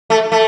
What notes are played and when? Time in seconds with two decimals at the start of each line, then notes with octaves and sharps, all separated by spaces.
0.10 A3
0.32 A3